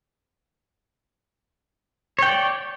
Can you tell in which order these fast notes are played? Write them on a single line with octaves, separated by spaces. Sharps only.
C#5 G5 D5